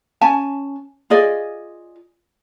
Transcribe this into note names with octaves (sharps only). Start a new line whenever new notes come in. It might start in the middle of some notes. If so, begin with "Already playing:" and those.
C#4 G#5 A5
F4 G#4 D5 D#5